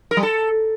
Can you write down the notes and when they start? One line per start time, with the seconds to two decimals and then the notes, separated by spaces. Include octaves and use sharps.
0.11 A#4
0.17 G3
0.23 A4